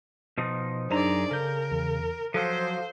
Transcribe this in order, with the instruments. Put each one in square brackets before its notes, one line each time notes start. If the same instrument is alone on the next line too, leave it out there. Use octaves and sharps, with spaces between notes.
[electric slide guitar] B2 F3 D#4
[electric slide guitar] F#2 A#5 [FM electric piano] D4 D#4 C5 [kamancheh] G#4 D5
[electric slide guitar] C#3 [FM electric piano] A4 G6 [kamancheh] A#4
[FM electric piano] E2
[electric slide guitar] F3 F#3 [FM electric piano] A4 F5 [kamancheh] C5